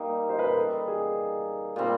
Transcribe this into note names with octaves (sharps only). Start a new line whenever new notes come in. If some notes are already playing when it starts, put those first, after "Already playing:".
Already playing: G3 A#3 D#4
C5
B4
A#4
A4
G#4
A#2 G3 C4